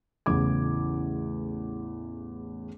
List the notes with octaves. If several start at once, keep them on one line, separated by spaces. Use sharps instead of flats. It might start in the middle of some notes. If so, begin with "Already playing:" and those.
A1 E2 C#3 D6 G#6